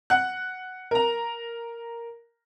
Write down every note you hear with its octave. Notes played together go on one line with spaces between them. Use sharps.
F#5 F#6
A#4 A#5